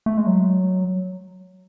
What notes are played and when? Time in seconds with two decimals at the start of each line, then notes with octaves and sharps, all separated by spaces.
0.06 A3
0.17 G#3
0.27 F#3